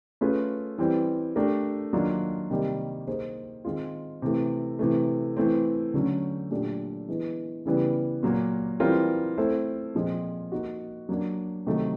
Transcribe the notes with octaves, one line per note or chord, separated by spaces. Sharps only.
A3 C#4 F4 G#4 B4
E3 G3 C4
A3 D4 G4 A#4
D#3 F#3 A#3 D4 F4
C3 D#3 G3 A#3
A#3 D#4 G#4 C5
D#3 G#3 C4 F4
C3 E3 A3
C3 E3 A3
E3 A3 C4
D3 F#3 A3 C#4
A#2 F#3 A3 D4 G4
E3 G#3 B3
C#3 E3 G3 B3
A#2 F#3 A#3
E3 G3 C4 F4 A#4
A3 C4 E4 A4 C5
A#2 F3 G#3 C4
A#3 D#4 F#4
F#3 A#3 D4
C3 D#3 F#3 A3